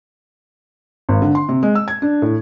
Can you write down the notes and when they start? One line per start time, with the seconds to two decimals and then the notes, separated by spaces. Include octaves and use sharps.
1.09 G#1
1.22 D3
1.35 C6
1.49 C3
1.63 G#3
1.75 E6
1.88 G#6
2.02 D4
2.22 A2